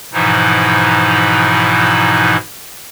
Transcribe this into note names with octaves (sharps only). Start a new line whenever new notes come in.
G#2 B2 E3 F3 D#4 E4